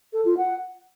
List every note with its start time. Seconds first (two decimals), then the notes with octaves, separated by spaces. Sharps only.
0.13 A4
0.25 F4
0.37 F#5